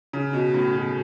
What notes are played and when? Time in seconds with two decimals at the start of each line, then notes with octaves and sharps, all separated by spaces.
0.13 C#3
0.33 B2
0.54 A2
0.75 B2